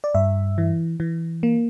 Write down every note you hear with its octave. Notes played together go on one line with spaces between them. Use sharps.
D5
G2 E5
E3
E3
A#3